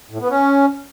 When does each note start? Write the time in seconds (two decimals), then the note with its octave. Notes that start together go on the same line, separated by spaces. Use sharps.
0.11 A2
0.20 B3
0.29 C#4